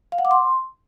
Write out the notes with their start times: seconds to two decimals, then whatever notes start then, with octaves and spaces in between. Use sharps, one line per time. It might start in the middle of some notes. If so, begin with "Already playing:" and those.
0.12 F5
0.18 F#5
0.25 D6
0.31 C6